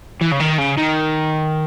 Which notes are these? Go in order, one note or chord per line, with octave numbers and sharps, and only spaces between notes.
E3
C#3
D#3
C#3
D#3